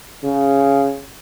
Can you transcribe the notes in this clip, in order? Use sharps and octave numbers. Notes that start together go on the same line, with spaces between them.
C#3